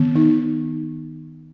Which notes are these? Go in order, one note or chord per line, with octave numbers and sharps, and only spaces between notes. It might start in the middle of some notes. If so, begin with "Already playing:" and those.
Already playing: D#3 B3
D#4